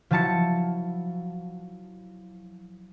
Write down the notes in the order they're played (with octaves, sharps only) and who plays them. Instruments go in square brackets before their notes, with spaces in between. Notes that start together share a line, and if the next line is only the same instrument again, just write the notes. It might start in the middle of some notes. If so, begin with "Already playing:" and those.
[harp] F3 F#3 E4 A5 A6 C#7